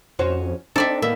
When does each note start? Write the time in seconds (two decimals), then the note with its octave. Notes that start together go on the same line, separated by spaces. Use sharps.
0.19 F2 C#4 F#4 C5
0.76 C4 D4 D#4 A4 D5 E5
1.02 A2 D#3 A#3 B3 E5